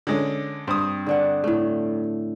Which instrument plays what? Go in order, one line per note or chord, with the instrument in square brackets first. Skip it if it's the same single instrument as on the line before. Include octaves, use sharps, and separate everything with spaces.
[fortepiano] D3 G#3 C#4
[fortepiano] G2 D#6 [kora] C4
[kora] D3 D4 F#5
A2 A3